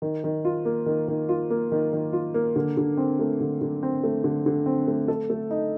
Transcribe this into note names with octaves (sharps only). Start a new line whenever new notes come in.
D#3
D#3
F4
A#3
D#3
D#3
F4
A#3
D#3
D#3
F4
A#3
D3
D3
C4
A3
D3
D3
C4
A3
D3
D3
C4
A3
A4
A3
D#4